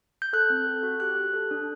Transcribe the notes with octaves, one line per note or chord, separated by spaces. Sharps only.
G6
A4 F#6
C4
A4
F#4
G4 F#6
G4
A4
D4